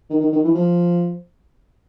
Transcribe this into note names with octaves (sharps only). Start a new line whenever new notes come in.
D#3
D#3
D#3
E3
F3